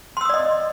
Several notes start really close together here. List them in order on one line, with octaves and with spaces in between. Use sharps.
C6 E6 D#6 D5 D#5